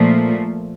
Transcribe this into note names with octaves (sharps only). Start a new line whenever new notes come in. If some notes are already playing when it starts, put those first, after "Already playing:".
Already playing: A#2 F3 A3